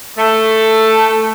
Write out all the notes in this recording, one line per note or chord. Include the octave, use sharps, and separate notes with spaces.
A3